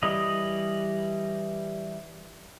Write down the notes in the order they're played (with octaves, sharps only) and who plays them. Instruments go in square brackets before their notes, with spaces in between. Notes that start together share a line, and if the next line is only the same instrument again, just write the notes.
[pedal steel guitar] E3 G3 B4 D#5 D#6